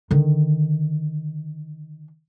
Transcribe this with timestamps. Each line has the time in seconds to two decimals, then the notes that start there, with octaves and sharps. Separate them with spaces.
0.11 D3 D#3